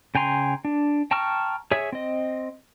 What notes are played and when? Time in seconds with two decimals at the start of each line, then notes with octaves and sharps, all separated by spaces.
0.15 C#3 G5 G#5 A#5 C6
0.65 D4
1.11 G5 A5 A#5 C#6 F6
1.71 G#4 C#5 E5
1.92 C4 D#5